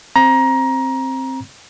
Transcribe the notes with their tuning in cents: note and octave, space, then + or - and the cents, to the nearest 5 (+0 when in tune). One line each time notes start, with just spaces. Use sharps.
C4 +10 A#5 +20